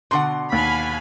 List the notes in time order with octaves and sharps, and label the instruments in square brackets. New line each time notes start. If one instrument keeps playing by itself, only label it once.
[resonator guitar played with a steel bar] B2 D3 F#5 [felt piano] C6
[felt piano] D#2 [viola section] F5 G#5 B5